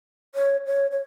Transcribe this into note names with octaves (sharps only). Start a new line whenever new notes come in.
C#5
C#5
C#5